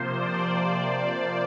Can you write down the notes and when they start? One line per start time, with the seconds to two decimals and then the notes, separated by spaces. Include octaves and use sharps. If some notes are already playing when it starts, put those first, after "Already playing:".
Already playing: C3 F3 A#3 C5
0.16 D5
0.85 D5